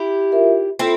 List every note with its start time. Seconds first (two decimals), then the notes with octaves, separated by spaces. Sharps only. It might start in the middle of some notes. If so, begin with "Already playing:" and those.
Already playing: E4 G4
0.32 F4 A#4 E5
0.79 C4 E4 F4 A4